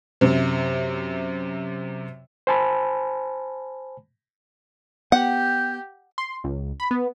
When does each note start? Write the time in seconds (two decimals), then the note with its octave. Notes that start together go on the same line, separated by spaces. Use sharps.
0.21 F#2 C3
2.47 C5 G#5 A5 B5
5.12 B3 G4 F#5 G5
6.18 C6
6.44 C#2
6.80 B5
6.91 B3